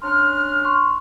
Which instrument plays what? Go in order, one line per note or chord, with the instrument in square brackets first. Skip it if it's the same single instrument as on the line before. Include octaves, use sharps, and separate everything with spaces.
[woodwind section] C#4 D4 F6 [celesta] C6
[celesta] C6 C#6